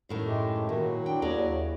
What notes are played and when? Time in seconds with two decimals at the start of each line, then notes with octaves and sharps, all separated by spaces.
0.09 F#2 A2 D#3
0.27 G#3 A3 G4
0.69 A#2 D#3 F#3 E4 F#4
1.06 D4 G5
1.22 D#2 G#4 A#4 D5